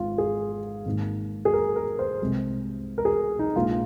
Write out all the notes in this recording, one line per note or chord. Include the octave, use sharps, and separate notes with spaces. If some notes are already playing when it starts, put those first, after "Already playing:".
Already playing: G#1 G#2 F4
G#4
G#1 G#2 D#3 A#3
G#4
A#4
A#4
C5
C2 C3 G#3
A#4
G#4
D#4
A#1 A#2 G#3 F4